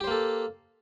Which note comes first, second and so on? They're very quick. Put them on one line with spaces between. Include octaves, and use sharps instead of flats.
G4 C5 A#3 A4